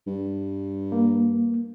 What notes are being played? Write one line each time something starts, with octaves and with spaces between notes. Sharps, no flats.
G2
A#3